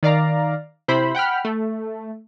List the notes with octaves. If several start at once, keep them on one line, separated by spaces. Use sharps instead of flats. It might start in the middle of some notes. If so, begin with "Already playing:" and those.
D#3 D5 F5 A#5
C3 E4 C5 B5
F#5 G5 B5 F6
A3